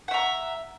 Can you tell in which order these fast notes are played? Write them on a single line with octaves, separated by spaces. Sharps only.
F#5 E5 A#5